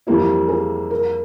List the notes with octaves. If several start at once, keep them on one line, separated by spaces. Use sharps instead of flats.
F2 E3 G3 A#3 E4 G4
G#4
A#4